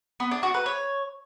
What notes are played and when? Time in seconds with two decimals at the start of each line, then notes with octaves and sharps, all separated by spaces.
0.20 B3
0.31 D4
0.43 F#4
0.54 B4
0.66 C#5